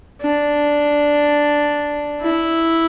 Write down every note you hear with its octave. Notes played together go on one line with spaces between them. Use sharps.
D4
E4